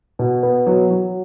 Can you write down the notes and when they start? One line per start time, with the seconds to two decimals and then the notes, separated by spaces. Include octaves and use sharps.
0.19 B2
0.43 B3
0.67 F#3
0.91 F#3